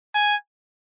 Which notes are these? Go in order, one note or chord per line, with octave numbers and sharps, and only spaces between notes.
G#5